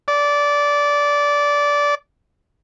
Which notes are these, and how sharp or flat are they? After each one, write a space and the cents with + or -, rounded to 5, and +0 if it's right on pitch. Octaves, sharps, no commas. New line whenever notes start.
D5 -15